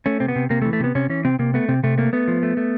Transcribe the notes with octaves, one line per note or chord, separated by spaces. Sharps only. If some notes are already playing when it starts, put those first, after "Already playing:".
A3 C#4
C3 C4
B3
C3
C3 A#3
A3
E3
A3
C3 B3
C3 C#4
E3 C#4
C3 C4
C3 A#3
A3 B3
C3 C4
C3 A3
A3 A#3
A3 B3
F3
A3
A3